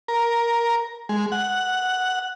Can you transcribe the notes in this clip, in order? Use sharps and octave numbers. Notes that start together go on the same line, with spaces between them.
A#4
G#3
F#5